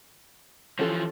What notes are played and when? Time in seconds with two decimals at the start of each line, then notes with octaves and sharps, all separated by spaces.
0.79 E3 F3 C#4 G4 A4